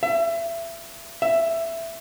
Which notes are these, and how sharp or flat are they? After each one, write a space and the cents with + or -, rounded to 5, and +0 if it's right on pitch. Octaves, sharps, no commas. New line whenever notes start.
E5 +30
E5 +10